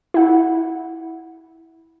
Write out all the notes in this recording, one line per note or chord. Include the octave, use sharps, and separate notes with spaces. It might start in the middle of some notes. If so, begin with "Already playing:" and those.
E4 F#5